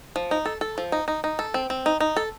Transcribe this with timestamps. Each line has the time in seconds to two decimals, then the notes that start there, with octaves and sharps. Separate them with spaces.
0.16 F3
0.31 D#4
0.46 A4
0.61 A4
0.78 F3
0.92 D#4
1.08 D#4
1.24 D#4
1.39 A4
1.54 C4
1.70 C4
1.86 D#4
2.00 D#4
2.16 A4